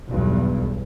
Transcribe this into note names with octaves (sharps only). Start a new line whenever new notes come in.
B1 E2 G2